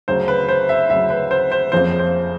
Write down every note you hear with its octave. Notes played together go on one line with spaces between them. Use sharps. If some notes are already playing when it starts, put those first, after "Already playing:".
D2 C#3 F#3 C5
B4
C5
E5
D2 C#3 F#3 E5
B4
C5
C5
F#1 F2 C#3 F3 C5
C5